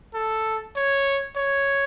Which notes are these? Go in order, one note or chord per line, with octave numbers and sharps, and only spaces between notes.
A4
C#5
C#5